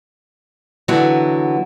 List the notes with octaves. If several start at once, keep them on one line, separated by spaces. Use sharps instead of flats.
D3 E3 F#3 B3 E4 F#4